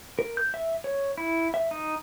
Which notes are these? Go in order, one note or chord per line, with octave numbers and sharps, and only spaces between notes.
A#4
G6
E5
C#5
E4
E5
D#4